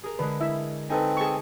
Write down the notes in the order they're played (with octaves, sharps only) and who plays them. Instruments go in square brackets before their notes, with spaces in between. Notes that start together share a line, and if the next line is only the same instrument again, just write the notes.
[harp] G#4 A#4
[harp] D3 G#3 [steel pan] B4
[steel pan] E4 E5
[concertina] C4 [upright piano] D#4 A4 B4 [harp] G#5
[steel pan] G#4 A5 C#6